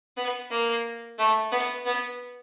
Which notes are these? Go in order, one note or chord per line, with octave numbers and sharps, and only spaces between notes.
B3
A#3
A3
B3
B3